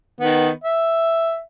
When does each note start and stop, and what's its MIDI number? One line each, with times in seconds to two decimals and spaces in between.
0.21 0.49 51
0.21 0.49 59
0.64 1.39 76